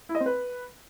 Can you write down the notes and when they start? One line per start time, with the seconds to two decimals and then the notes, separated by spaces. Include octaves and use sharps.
0.09 E4
0.15 D#5
0.20 C4
0.26 B4